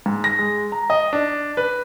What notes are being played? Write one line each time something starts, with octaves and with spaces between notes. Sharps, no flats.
G#2
A#6
G#3
A#5
D#5
D4
B4